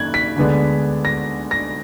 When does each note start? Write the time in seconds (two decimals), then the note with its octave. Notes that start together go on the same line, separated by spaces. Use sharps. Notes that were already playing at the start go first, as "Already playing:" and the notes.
Already playing: F#2 D#3 A#3 F#6 G#6
0.14 B6
0.36 D2 D3 G#3 B3 D4
1.05 A#6
1.51 A#6